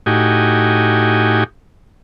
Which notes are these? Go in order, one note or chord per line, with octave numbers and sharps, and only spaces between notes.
A2 D#4 F#4 G4 G#5